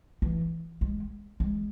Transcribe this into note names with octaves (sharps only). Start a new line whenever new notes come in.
E3
G#3
G#3